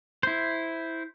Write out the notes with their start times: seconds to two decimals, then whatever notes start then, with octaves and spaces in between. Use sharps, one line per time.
0.23 E4 C5